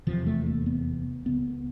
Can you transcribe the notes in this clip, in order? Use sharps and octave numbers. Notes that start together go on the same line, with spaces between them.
F1 E2 C3 F3
A3
A#3
B3
C#2 C#3 B3